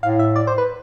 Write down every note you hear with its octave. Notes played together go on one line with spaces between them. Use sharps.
A2 F5
E5
D5
C5
B4